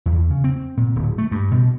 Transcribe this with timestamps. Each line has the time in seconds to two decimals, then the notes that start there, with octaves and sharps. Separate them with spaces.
0.06 E2
0.30 C#3
0.44 C4
0.77 A#2
0.96 D1
1.18 A3
1.31 G2
1.51 B2